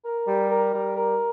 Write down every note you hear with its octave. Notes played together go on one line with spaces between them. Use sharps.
A#4
G3
A#4
G3
A#4